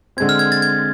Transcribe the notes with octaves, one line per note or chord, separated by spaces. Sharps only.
D3 G#3 C4 G#6
F6
G#6
A6
G#6